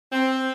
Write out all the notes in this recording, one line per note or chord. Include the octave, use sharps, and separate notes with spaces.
C4